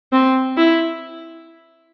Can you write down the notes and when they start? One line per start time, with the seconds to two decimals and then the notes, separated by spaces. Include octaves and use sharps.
0.13 C4
0.57 E4